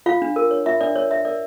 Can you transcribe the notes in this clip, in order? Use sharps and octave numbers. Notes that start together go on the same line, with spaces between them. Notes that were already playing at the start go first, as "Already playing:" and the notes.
F4 F5
D4
A#4
C#5
F4 E5
D4 D5
A#4 C#5
C#5 E5
A#4 D5